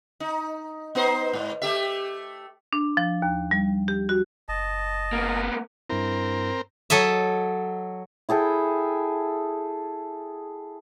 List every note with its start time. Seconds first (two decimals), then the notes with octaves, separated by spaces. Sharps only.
0.20 D#4
0.95 B3 D#4 C5
1.33 G#2
1.62 A3 G4 E5
2.73 D4
2.97 F3
3.22 D#2
3.51 G3
3.88 G4
4.09 F#4
4.49 F#1 D#5 A5
5.13 A#3 B3
5.90 G2 C4 E4 A#4
6.90 F#3 A4 D#5 E5
8.29 E4 G#4 A4 G5